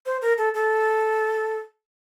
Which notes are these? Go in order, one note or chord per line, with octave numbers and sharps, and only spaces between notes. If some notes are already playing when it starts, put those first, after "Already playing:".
C5
A#4
A4
A4